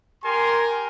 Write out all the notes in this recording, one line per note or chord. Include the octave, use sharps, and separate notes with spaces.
G4 A#4 G#5 C6